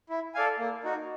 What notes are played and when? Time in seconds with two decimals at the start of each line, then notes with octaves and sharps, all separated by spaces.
0.10 E4
0.35 A4 D5 F5 G#5
0.59 A#3
0.84 D#4 F#4